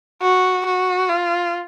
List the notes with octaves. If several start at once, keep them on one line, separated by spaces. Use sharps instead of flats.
F#4
F#4
F4